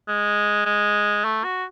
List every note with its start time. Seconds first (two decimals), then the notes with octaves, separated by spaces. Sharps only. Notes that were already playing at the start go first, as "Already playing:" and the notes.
0.08 G#3
0.65 G#3
1.25 A3
1.44 F#4